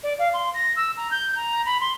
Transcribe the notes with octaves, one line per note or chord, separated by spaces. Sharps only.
D5
F5
C6
A#6
E6
A#5
G6
A#5
B5
C6